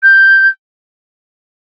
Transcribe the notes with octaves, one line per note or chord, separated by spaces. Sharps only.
G6